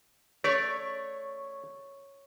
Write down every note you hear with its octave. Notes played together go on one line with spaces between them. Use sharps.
A3 C#5 D5